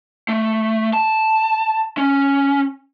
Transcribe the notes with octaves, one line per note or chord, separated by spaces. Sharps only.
A3
A5
C#4